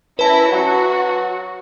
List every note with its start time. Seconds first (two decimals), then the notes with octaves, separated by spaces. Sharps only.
0.19 C#4 E4 B4 A5 A#6
0.52 F#3 F#4